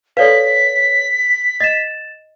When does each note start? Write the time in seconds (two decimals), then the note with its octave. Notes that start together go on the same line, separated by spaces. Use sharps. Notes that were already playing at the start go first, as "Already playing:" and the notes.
0.17 A4 B4 C#5 D5 F5 B6
1.60 D#5 A6 E7